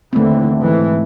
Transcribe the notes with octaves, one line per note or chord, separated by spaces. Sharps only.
D#2 D3 E3 A3 C4
G#2 E3